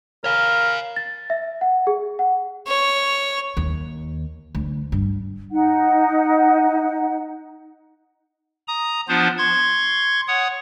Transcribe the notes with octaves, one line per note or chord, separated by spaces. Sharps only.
A#4 C#5 F5
A6
E5
F#5
G#4
F#5
C#5
D#2
D2
G2
D#4 F#5
A#5 D#6
F3 B3 D4 F4 C5
C6 C#6 G#6
C#5 F#5 D#6